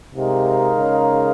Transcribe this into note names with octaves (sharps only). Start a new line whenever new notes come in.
C3 G#3 D#4 A#4 F5
C#3